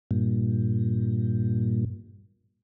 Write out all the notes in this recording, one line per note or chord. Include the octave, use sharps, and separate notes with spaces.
G2 A#2